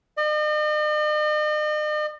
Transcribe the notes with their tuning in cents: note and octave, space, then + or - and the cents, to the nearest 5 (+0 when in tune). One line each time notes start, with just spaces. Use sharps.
D#5 -45